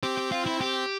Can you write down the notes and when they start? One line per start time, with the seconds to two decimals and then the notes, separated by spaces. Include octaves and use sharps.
0.03 C4 G4
0.18 G4
0.32 F4
0.46 E4
0.61 G4